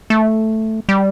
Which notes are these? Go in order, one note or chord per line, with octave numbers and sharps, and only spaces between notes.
A3
G3